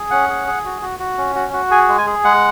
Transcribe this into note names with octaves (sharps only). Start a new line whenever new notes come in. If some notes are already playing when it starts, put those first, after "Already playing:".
Already playing: G#4
C#4 F#5
G#4
G#4
F#4
F#4
F#4
C#4
F#4
F#4
G#4 G#5
G#3
G#5
G#4
G#3 F#5